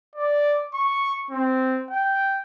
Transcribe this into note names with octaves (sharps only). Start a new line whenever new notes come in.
D5
C#6
C4
G5